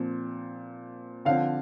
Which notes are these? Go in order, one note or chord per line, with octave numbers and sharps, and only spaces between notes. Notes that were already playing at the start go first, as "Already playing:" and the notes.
Already playing: A#2 F3 C4
D3 F3 C4 F5